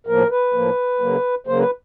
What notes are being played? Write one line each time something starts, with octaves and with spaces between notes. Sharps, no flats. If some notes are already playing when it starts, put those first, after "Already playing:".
A2 F3 A#3 A#4
B4
A2 F3 A#3
C#3 F#3 A#3
C#3 F#3 A#3 C5
B4